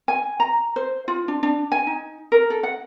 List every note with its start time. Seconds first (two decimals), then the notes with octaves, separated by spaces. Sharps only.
0.08 G#5
0.40 A#5
0.76 C5
1.08 F4
1.28 D4
1.43 D4
1.72 G#5
1.87 D#4
2.32 A#4
2.50 A4
2.63 F#5